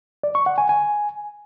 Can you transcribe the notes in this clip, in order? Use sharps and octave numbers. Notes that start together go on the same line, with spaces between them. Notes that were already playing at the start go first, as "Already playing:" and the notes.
D5
C#6
F#5
G#5
G#5